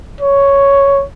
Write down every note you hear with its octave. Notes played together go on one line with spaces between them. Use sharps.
C#5